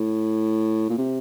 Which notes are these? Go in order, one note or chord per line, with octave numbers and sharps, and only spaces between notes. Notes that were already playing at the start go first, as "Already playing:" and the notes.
Already playing: A2
A#2
C3